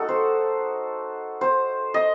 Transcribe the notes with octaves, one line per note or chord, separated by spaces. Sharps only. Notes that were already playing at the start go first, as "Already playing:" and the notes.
Already playing: A3 D#4 F#4 A4
C5
C5
D#5